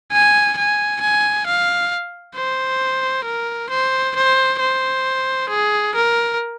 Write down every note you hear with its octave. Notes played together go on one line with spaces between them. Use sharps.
G#5
G#5
G#5
F5
C5
A#4
C5
C5
C5
G#4
A#4